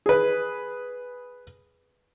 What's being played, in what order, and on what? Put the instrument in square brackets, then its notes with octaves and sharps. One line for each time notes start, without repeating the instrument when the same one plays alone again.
[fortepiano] G#4 B4